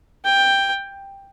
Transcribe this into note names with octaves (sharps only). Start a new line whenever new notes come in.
G5